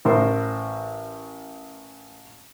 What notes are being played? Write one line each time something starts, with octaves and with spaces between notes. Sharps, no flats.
A1 A2 A#4 C5